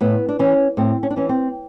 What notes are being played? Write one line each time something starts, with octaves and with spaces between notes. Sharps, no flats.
A2 B3
D4
E3 C#4
A2 C4
C#4
D4
E3 C#4
C4